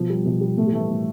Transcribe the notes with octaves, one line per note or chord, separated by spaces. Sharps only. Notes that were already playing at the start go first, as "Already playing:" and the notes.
Already playing: B2 F3
G3
B2 F3
G3
A2 A3
G3
E3 A3
A2